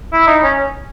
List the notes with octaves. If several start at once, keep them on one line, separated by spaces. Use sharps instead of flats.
E4
D#4
C#4